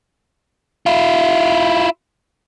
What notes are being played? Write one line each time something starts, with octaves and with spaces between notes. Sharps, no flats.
E4 F4